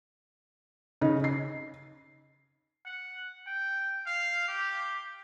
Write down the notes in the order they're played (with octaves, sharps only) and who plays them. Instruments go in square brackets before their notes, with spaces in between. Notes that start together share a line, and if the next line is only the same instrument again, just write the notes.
[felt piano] C#3 D#4
C7
[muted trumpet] F#5
G5
F5
G4